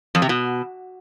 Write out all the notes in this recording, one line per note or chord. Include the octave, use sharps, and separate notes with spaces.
F2
C3
B2